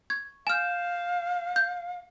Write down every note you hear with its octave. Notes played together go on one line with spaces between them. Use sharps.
C#6 G#6
F5 G#5 F6 G6 E7
G6